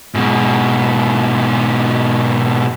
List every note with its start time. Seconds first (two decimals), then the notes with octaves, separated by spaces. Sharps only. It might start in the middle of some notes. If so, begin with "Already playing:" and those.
0.14 G#2 B2